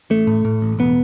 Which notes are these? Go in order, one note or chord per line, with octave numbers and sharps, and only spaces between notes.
A1 A3
A2
A2
A1
E1 B3